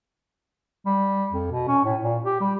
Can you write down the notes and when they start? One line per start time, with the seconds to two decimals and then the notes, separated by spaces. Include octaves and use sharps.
0.86 G3
1.32 F2
1.51 B2
1.68 C#4
1.84 A2
2.03 A#2
2.24 G4
2.41 G3